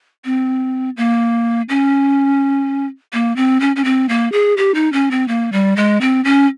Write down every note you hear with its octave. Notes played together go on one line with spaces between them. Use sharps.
C4
A#3
C#4
A#3
C4
C#4
C#4
C4
A#3
G#4
G4
D#4
C#4
C4
A#3
G3
G#3
C4
C#4